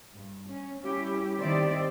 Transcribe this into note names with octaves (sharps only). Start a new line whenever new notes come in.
G2
C#4
G3 C#4 E4 G4
D#3 C4 G4 C5 D5 E5